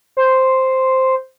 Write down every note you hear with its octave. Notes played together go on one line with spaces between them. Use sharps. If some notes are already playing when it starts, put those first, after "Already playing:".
C5